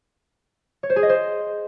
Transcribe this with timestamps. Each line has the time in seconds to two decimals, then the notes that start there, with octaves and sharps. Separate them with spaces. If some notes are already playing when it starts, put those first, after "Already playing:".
0.83 C#5
0.90 C5
0.96 G#4
1.03 D#5
1.09 C5